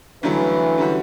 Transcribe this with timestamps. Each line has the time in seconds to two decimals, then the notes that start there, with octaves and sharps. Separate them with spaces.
0.23 G1 G2 D3 E3 F#3 A3
0.78 D3 G3 C#4 F#4